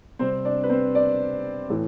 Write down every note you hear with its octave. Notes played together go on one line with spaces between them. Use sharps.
C3 G3 C4 C5
D4 D5
B4
C4 C5
D4 D5
A2 E3